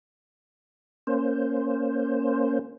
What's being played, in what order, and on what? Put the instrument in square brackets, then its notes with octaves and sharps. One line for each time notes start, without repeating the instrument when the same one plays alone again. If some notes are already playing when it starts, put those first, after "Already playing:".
[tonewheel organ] A#3 C#4 C5